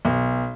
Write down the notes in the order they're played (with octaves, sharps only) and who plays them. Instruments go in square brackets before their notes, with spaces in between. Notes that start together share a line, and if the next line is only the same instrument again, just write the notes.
[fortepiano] B1